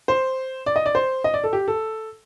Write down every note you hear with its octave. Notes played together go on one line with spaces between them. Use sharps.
C5
D5
D#5
D5
C5
D#5
D5
A4
G4
A4